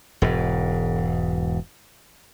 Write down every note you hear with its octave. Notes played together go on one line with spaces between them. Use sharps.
E1 G#2